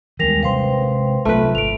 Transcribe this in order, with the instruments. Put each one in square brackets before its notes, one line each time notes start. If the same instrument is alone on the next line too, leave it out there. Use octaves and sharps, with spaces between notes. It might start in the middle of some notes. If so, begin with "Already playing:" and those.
[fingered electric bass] D#2 E3 [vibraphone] G3 G#3 [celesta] A#4 A#6 F7
[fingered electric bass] C3 G#3 [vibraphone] B4 C5 G5 [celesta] F5 C6
[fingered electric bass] C2 C3 F#3 [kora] A3 B4 [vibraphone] F4
[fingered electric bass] G#1 [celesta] D7 F7